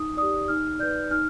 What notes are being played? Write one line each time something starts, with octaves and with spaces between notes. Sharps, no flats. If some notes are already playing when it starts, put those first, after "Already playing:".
Already playing: D#4 D#6
G4 D5 D#6
D#4 F6
B4 D5 G6
D#4 F6